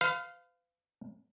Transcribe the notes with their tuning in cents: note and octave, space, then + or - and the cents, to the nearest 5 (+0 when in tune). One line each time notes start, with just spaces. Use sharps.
B4 +45 F5 +0